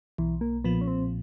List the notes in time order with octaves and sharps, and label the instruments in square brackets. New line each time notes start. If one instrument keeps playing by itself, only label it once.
[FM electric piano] B1 [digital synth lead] E3
[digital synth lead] A#3
[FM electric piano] A#2 F3 [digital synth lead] B3
[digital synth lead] C#4
C4